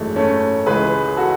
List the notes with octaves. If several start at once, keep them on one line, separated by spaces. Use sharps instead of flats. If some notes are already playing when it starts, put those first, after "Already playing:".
Already playing: G#1 F#2 E3 G#3 A3
A3 C#4
C#2 C#3 E3 G#3 G#4 B4
F#4 A4